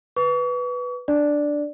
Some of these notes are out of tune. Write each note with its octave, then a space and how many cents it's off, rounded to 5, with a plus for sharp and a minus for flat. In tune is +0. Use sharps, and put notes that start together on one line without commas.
B4 +0 C#6 +40
D4 +0 D5 +0